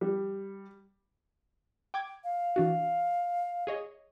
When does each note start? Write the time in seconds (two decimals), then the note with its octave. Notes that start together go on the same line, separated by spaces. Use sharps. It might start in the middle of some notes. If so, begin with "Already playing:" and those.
0.01 G3
1.94 G5 D6 G#6
2.24 F5
2.56 E3 D4 F#4
3.67 G#4 C#5 D#5